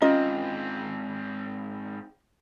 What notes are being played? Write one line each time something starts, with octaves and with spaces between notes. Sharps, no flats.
G#2 C4 C#4 F4 D#5